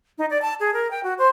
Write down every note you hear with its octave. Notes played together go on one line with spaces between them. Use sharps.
D#4
D5
A5
G#4
A#4
G5
F#4
C5